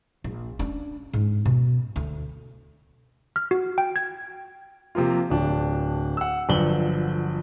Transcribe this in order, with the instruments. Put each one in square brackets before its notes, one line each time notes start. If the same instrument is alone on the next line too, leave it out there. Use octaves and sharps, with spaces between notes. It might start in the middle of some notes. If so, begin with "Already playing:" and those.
[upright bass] A#1
C#4 D4
G#2
B2
D2
[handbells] F6
F#4
G5
G#6
[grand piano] C3 F3 A#3 F4
D1 D4
F#5 E6
G1 D3 F3 F#3 F#7 G7